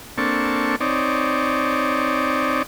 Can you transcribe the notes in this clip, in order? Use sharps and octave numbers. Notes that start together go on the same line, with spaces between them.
A#3 C4 D4 A4 C#6
C4 D#4 C#5 D5